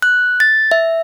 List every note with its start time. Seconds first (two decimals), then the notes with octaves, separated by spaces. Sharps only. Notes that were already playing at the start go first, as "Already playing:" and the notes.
0.02 F#6
0.40 A6
0.71 E5